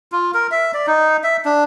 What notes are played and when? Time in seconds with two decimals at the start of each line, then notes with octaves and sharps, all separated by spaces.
0.12 F4
0.34 A#4
0.51 E5
0.74 D5
0.87 D#4
1.24 E5
1.45 D4